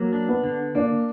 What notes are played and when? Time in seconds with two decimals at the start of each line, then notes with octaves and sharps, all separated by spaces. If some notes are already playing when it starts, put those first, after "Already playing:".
Already playing: F#3 A#3
0.13 D4
0.28 B3
0.43 D3
0.75 A#3 D4